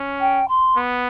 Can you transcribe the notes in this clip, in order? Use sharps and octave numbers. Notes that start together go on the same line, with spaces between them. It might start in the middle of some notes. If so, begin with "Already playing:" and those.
Already playing: C#4
G5
C6
B3